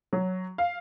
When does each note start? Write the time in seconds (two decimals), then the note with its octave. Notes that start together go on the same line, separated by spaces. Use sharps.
0.13 F#3
0.58 F5